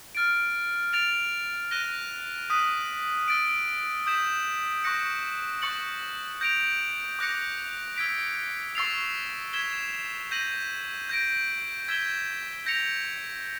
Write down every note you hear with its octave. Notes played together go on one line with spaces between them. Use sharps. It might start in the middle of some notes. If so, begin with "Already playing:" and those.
F6 A6 D7
A6 D7 F7
F#6 A#6 D#7 G7
D#6 F#6 B6 D#7
E6 A6 D7
D#6 G6 B6 E7
C#6 F#6 A#6 C#7
C#6 F#6 A6 C#7 F#7
G6 A#6 D7 F7
D6 F#6 A#6 C#7
E6 G#6 B6 D7
C#6 E6 A6 C7 F7
G#6 B6 E7 G7
G6 A#6 D#7 F#7
G6 A#6 D7
E6 G#6 B6 E7 G7
G6 A#6 C#7 F7